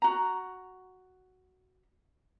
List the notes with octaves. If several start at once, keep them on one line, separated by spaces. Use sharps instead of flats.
F#4 A#5